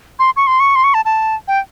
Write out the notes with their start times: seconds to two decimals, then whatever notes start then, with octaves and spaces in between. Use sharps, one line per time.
0.19 C6
0.36 C#6
0.47 C6
0.60 C#6
0.76 C6
0.84 C#6
0.94 A5
1.05 A5
1.48 G5